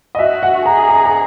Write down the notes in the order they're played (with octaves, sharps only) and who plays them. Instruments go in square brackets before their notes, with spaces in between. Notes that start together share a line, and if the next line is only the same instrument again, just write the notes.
[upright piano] D#5
[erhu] F#4 [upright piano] E5
[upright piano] F#5
[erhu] G#4 [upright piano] A#5
[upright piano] A#5
A#5